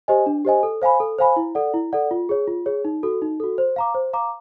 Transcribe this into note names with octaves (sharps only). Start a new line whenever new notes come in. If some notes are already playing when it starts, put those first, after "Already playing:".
G4 C5 D#5 G#5
D4
G4 C5 D#5 G#5
A4
C5 F5 G#5 B5
A4
C5 F5 G#5 B5
E4
A4 D5 F#5
E4
A4 D5 F#5
F4
G#4 C#5
F4
G#4 C#5
D#4
F#4 A4
D#4
F#4 A4
C5
F5 A#5 D6
C5
F5 A#5 D6